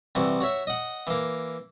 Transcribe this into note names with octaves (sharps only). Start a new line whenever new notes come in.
C2 E3 F#4
F#4 C#5 E5
D#5 F#5
E3 A#3